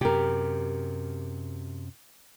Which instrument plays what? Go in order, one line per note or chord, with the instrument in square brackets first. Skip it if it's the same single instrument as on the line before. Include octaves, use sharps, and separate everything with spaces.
[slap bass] F#2 C3 [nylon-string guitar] G4 A#4